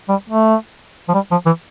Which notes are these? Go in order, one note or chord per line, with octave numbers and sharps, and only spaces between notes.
G3
A3
F3
G3
F3
E3